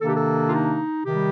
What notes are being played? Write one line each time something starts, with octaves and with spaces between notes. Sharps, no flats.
C3 D#3 A#3 D4 A4
G4
A4
F4
D#4
C3 D#3 G3 G4